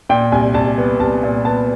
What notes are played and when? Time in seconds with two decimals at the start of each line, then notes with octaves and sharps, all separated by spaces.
0.09 A#2 G5
0.32 C2 G#5
0.54 C2 A5
0.78 B3
1.00 C2 A5
1.23 A#2
1.45 B3 A5